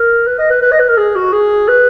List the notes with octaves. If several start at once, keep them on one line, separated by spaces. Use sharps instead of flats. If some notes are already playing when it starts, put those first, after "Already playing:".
Already playing: A#4
B4
D#5
B4
B4
D#5
B4
A#4
G#4
F#4
G#4
B4